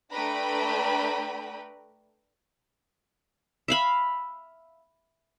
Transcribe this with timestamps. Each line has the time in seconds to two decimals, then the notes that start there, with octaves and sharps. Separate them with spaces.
0.12 A3 D4 B4 G5 A#5 B5
3.68 E5 F5 B5